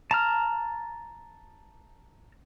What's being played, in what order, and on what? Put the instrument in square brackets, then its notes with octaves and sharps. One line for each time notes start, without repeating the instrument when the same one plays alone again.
[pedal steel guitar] A5 A#5 F6